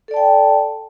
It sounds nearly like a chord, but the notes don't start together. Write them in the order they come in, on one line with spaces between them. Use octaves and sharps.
A4 D5 A5 G5